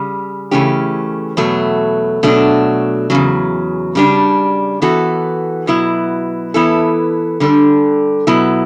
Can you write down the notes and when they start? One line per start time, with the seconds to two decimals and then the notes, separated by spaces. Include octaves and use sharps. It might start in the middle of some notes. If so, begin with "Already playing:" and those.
Already playing: C#3 G3
0.51 C#3 E3 A3 C#4 G4
1.37 E2 B2 F#3 A3
2.23 B2 F#3 A3 D4
3.10 E2 C#3 F#3
3.95 C#3 G3 D4
4.82 E3 B3 F#4 A4
5.67 B2 F#3 B3 E4
6.54 E3 B3 E4 A4
7.40 D3 G3 D4 A4
8.27 B2 F#3 B3 E4